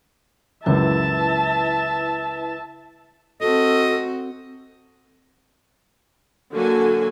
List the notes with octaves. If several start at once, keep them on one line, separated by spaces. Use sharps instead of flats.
C#2 F#2 E4 B4 E5 A5
C4 F#4 A4 D#5
D3 F#3 A#3 F#4 A4 G#5